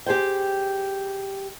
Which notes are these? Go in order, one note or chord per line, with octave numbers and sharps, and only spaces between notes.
G4 G#4 C5 G5